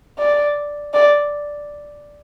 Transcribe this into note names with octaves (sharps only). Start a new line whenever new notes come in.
D5
D5